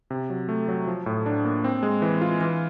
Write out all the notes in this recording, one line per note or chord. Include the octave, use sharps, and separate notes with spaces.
C3
F#3
A3
F#3
F3
A2
D4
A#3
C4
G#3
E3
F4
E3